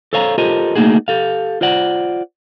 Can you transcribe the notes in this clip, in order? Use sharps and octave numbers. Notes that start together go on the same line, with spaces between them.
A4 C5 C#5 F5 G5 A#5
F4 G4 A4 A#4 C5 D#5
A3 A#3 C4 D#4 F#4 G#4
G4 A4 F5
F4 C5 D5 F#5